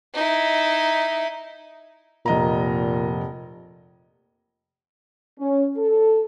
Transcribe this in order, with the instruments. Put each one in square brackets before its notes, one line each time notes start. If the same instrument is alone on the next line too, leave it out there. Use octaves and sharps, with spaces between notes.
[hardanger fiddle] D#4 E4
[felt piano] F1 D#5 A#5 [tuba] A#2
[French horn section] C#4
A4